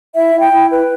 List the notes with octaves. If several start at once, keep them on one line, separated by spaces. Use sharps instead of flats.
E4 E5
E4
G5
E4
B4